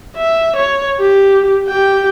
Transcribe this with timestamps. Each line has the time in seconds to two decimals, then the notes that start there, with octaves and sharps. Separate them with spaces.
0.17 E5
0.57 C#5
1.00 G4
1.67 G4 G5